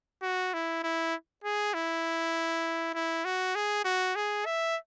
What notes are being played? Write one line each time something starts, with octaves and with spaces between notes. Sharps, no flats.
F#4
E4
E4
G#4
E4
E4
F#4
G#4
F#4
G#4
E5